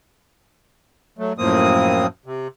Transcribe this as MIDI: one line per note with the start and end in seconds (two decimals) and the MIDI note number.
1.19 1.33 54
1.19 1.33 57
1.38 2.07 42
1.38 2.07 45
1.38 2.07 53
1.38 2.07 58
1.38 2.07 60
1.38 2.07 87
2.26 2.48 48